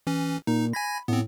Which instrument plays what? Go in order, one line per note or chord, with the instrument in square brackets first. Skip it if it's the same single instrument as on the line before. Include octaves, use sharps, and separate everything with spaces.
[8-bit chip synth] E3 C#4
[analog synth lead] A#2 [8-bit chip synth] D#4
[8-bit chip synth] G#5 G#6 A#6 [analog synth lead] B5
[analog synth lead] A2 [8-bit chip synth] B3 C4